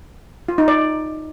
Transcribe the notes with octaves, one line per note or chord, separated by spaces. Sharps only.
F4
D#4
D5